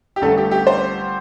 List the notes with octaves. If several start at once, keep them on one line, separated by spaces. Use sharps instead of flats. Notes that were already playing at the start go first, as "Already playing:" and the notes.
G4
G1 G2 D3 A3 A4
G4
G4
C5